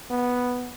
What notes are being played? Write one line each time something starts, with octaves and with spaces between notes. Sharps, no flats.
B3